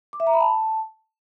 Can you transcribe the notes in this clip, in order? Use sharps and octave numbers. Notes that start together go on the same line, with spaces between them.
D6
E5
A#5
B5
A5